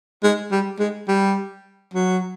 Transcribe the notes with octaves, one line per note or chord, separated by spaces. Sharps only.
G#3
G3
G#3
G3
F#3